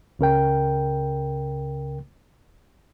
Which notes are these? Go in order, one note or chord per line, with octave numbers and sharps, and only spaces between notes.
C#2 C#3 A#4 G5